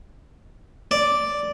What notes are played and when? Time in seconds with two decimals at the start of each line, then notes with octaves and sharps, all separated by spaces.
0.91 D5